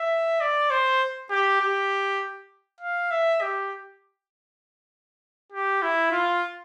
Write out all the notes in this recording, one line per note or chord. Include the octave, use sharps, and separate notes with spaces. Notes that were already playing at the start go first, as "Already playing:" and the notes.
Already playing: E5
D5
C5
G4
G4
F5
E5
G4
G4
E4
F4